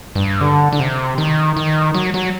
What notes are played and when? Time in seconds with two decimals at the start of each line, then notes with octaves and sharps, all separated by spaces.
0.15 G2
0.41 D3
0.73 D3
0.80 C3
1.18 D#3
1.57 D#3
1.94 F#3
2.14 F#3